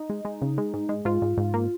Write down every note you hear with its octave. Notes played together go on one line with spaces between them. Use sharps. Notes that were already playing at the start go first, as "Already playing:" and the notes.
Already playing: D#4
G#3
G#3
C#3
G#3
G#2
G#3
G#2 F4
G#2
G#2
A#3